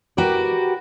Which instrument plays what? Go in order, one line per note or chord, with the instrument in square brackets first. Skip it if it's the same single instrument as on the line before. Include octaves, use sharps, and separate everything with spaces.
[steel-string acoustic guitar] F#4 G4 A#4 B4 D5